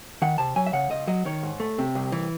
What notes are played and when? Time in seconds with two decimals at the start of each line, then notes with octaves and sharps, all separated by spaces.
0.22 D#3 F#5
0.38 C3 A5
0.56 F#3 G#5
0.66 E5
0.73 C#3 F#5
0.90 C#2 D#5
1.07 F#3 D#5
1.25 D#3 C#5
1.43 G#2
1.60 A3
1.78 C3
1.95 C2
2.12 E3